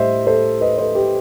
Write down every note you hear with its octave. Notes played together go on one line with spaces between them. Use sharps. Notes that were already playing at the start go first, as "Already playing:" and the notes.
Already playing: A2 G3 C5 D#5 E5
A4 C5
B4 D#5
A4 C5
G4 B4